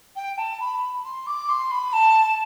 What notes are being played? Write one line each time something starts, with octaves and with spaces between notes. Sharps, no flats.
G5
A5
B5
C6
D6
C6
B5
A5